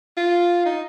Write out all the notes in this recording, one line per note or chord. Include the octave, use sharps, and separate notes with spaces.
F4
D#4